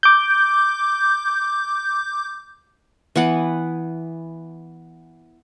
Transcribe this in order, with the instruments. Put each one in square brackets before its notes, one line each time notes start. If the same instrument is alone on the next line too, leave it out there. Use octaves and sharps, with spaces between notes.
[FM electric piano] D6 G6
[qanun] E3 B3 F#5